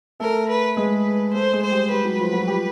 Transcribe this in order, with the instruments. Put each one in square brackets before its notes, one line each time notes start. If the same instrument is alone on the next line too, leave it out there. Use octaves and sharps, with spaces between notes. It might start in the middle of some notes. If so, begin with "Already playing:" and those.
[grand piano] A3 A4 [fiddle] A#4
[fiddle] B4
[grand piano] G#3 G#4 [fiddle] B4
[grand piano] A3 A4 [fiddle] C5
[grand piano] G#3 G#4
[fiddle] C5
[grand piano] G3 G4
[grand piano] G3 G4 [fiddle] B4
[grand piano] F#3 F#4
F3 F4
F#3 F#4
G3 G4